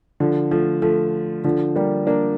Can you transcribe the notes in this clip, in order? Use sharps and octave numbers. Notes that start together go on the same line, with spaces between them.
D3 F3
F3 A3
F3 A3
D3 F3
G3 A#3
A#3 D4